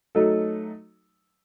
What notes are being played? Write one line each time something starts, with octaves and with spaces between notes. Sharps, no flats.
F#3 A3 D#4 A4